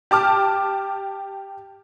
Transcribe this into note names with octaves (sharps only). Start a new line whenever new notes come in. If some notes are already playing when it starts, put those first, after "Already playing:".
G4 A5 D6 F6